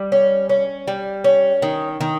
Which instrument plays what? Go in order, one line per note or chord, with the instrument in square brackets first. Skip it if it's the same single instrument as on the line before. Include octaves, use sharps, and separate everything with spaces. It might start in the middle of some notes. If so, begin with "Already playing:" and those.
Already playing: [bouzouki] G3
C#4
C#4
G3
C#4
D#3
D#3